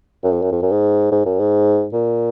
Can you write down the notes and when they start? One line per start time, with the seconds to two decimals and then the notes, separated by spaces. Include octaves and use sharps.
0.24 F#2
0.32 F2
0.42 F#2
0.52 F2
0.62 F#2
0.72 G#2
1.12 G#2
1.26 F#2
1.40 G#2
1.93 A#2